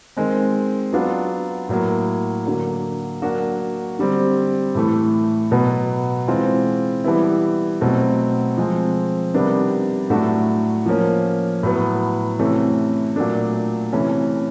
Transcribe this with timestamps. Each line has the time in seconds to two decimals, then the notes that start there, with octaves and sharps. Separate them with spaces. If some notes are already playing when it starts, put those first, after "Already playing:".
0.17 D#3 G#3 C4
0.93 F#3 B3 D4 F4
1.69 A2 F#3 A#3
2.45 D3 F#3 A#3
3.22 F#3 A#3 D4 F#4
3.99 D3 G3 C4
4.75 A2 E3 A3
5.51 B2 F#3 B3
6.28 E3 G#3 C4 F4
7.04 E3 G3 B3 E4
7.81 B2 F#3 A3 C4
8.58 F3 G#3 C4
9.34 C3 D#3 G3 B3 D4
10.10 A2 F#3 A3 D4 F#4
10.86 F3 A#3 C#4
11.63 A2 F#3 B3
12.39 C3 E3 A3 C#4
13.16 A#2 F#3 A3 D4
13.93 C3 E3 A3 C#4